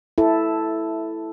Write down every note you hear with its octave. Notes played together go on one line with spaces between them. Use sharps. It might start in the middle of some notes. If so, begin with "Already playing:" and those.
E4 A4